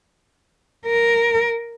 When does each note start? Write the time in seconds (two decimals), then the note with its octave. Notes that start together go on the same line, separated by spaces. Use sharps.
0.86 A#4